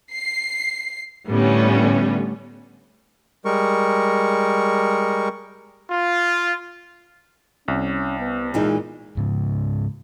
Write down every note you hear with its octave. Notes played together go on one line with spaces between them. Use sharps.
C7
A2 D3 G3 B3 C#4
G3 G#3 A#4 C#6
F4
C2 C#4
B3
A#2 E3 G#3 D#4
G#2 C#3